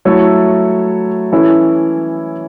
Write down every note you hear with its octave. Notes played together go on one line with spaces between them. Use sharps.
F#3 A3 E4 A4 C#5
E3 C#4 E4 A4 C#5